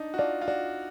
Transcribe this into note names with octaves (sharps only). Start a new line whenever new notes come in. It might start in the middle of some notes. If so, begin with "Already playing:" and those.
Already playing: D4 D#4
F#4
F4 D5
F4
F#4 D5